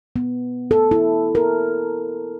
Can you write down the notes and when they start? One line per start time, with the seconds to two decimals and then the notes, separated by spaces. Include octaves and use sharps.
0.16 B3
0.71 A4
0.91 E4
1.35 A#4